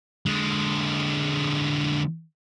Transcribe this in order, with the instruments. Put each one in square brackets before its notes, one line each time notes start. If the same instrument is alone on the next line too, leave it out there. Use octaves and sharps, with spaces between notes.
[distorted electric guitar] D3 G#3